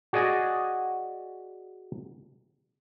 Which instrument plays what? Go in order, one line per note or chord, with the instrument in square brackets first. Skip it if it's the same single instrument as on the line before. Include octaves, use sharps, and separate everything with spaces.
[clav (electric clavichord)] F#4 G#4 D5 D#5 G#5